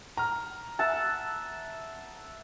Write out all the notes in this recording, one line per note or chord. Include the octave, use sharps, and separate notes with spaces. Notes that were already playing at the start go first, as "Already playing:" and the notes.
A#5 F6
E5 F#5 A5